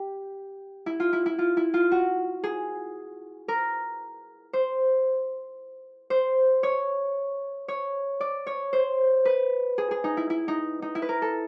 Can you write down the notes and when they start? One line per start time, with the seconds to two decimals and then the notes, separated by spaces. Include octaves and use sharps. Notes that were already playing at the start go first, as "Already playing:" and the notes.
Already playing: G4
0.86 E4
1.00 F4
1.13 E4
1.26 E4
1.39 F4
1.57 E4
1.74 F4
1.92 F#4
2.44 G#4
3.48 A#4
4.53 C5
6.10 C5
6.63 C#5
7.68 C#5
8.21 D5
8.47 C#5
8.73 C5
9.25 B4
9.78 G#4
9.91 G#4
10.04 D#4
10.17 E4
10.30 E4
10.48 D#4
10.82 D#4
10.95 E4
11.02 B4
11.09 A#4
11.22 A4